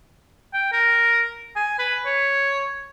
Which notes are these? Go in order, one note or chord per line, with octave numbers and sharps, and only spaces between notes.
G5
A#4
G#5
B4
C#5